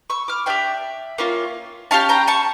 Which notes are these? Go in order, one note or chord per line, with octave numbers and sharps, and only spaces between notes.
C#6 E6
D6 F6
D4 G4 E5 G5
A#3 C#4 F4
C#4 G4 F5 A5
G5 A#5
A5 C#6